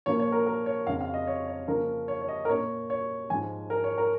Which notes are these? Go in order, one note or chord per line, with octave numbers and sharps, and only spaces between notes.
A#2 F3 A#3 C#4 C#5
C#5
A#4
A#4
C#5
F2 C#3 G#3 C#4 F5
F5
D#5
C#5
C#5
C#3 F3 A#3 C#4 A#4
C#5
C#5
D#5
A#4
A#2 A#3 C#4 C#5
C#5
G#2 F3 G#3 C#4 G#5
A#4
C#5
A#4